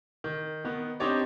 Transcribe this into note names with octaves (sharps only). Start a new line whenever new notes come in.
D#3
D#3 B3
C4 D4 D#4 G4 C#5 D5